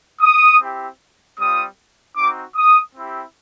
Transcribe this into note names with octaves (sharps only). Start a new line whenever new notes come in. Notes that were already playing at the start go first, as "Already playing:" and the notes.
D#6
C4 E4 G4
G3 C4 F4 D#6
C4 D#4 F#4 D6
D#6
C4 E4 G4